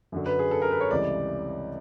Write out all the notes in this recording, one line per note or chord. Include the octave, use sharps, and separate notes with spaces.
F#2 D3 F#3
B4
G#4
A4
A#4
B4
C#5
C#2 C3 E3 G3 D5